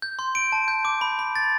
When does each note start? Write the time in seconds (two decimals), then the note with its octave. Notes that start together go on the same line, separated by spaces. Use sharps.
0.02 G6
0.19 C6
0.35 D7
0.52 A5
0.68 G6
0.85 D6
1.01 B5
1.19 B5
1.35 A6